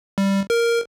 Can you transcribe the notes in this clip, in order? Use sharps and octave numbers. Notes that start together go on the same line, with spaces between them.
G3
A#4